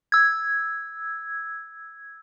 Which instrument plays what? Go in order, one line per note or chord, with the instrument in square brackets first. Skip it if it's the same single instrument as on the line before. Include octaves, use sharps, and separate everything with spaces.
[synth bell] E6 G#6